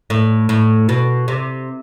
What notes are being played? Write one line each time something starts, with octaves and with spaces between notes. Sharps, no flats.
A2
A2
B2
C3